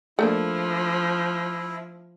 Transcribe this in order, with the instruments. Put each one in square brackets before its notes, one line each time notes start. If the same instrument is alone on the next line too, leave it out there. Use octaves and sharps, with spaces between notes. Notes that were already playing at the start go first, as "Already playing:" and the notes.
[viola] F3 [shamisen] A3 A#3 D4 [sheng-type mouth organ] E4